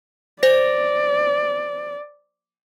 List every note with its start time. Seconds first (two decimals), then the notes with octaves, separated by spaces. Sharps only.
0.43 C5 D5 A#6